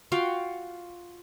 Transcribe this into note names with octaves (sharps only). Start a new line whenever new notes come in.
F4 F#4 F5 G5